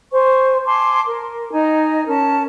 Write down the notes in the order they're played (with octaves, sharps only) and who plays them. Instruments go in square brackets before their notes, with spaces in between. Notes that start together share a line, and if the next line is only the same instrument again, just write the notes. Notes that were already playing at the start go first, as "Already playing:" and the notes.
[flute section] C5 G#5 C#6
G#5 A5 C6 D6
A#4
D#4 D#5 G#5 A#5
C#4 A#4 A5